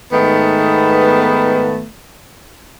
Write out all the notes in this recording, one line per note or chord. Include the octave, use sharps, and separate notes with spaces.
G#2 D#3 A3 B3